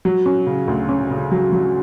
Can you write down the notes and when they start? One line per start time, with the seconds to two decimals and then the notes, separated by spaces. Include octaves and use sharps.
0.05 F#3
0.26 C#4
0.47 C#3
0.68 D2
0.89 C#4
1.10 C#3
1.31 F#3
1.52 F#3